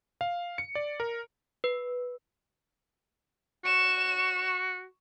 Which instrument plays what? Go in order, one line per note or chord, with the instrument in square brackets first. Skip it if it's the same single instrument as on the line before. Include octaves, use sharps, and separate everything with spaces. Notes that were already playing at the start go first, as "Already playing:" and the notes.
[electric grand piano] F5
C#7
D5
A#4
[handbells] B4
[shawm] F#4 [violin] C#6 E7